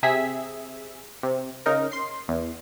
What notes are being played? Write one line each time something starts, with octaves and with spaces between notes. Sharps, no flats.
C3 G#4 E5 B6
C3
C#3 D#4 A#4
C6 C7
E2